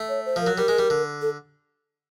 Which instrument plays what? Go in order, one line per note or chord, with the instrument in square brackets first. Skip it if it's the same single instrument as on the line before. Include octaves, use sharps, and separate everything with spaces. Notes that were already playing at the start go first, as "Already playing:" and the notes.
Already playing: [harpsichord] A3
[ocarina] C#5
C5
[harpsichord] F3
[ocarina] A#4
[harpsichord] F#3
[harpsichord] G3 [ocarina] A#4
[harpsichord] G#3
G3
D3
[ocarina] A4